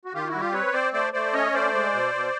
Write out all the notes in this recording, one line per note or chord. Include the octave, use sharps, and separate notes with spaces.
F#4
D#3 F4 G4
E4 F#4
G3
F4 G4
C4 B4 C#5
C4 C5 D5
A3 C5 D5
A3 C5 D5
C#4 C#5 D#5
A3 C5 D5
G#3
B2
B2